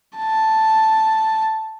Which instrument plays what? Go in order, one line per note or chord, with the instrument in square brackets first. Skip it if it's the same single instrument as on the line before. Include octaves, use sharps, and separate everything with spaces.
[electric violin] A5